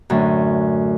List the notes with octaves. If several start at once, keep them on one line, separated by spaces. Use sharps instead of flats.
F#2 A2 D3